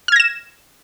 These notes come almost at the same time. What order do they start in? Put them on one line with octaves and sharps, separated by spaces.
F6 G#6 A#6 E7